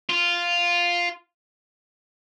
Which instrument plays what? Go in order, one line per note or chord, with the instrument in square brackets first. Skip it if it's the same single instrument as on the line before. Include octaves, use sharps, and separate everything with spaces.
[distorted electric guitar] F4